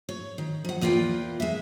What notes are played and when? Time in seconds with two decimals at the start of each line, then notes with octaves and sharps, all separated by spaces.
0.09 C#5
0.38 D#3
0.65 F3 F#5
0.81 E2 A#3 F4 B4 G5
1.40 G#3 E5